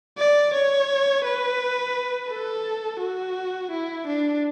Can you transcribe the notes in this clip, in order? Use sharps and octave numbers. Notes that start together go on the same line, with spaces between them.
D5
C#5
B4
A4
F#4
E4
D4